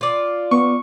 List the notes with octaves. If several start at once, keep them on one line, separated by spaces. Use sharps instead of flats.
F4 D5
B3 C#6